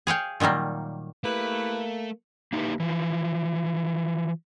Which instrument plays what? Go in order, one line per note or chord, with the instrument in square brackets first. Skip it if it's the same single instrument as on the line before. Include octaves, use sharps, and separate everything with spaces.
[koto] G#4 C#5 F5 G5
A#2 D#3 F#3 G3 A#3
[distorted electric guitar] A3 [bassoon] A#3 [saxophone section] E4 G4 B4
[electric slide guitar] A#3 D#4 E4 F#4 G4 B4
E3 F3